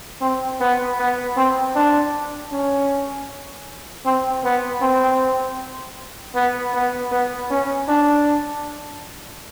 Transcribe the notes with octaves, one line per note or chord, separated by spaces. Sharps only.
C4
B3
B3
C4
D4
C#4
C4
B3
C4
B3
B3
B3
C#4
D4